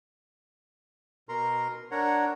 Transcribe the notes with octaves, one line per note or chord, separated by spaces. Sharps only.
B2 A#4 A#5 C6
D4 A#4 C#5 F#5 A#5